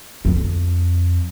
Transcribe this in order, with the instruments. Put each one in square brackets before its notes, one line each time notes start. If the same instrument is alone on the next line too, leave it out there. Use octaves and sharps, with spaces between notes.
[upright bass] F2